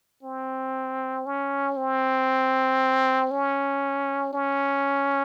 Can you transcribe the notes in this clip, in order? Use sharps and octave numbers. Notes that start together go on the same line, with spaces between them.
C4
C#4
C4
C#4
C#4